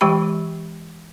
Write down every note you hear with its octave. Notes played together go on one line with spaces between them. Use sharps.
E3 G#3 G4 G5 B5